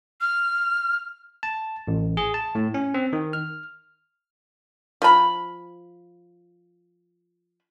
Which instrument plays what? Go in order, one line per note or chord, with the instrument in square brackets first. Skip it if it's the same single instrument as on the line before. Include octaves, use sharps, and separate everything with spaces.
[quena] F6
[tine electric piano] A5
A1
G#4
A5
A2
C#4
C4
D#3
F6
[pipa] F3 B5